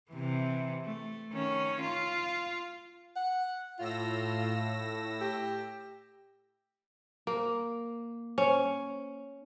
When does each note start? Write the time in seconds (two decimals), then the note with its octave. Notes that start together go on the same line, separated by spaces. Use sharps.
0.11 C3 E3
0.85 A3
1.31 D#3 C#4
1.81 F4
3.16 F#5
3.79 A2 F4 E6 A#6
5.21 G4
7.27 A#3
8.38 C#4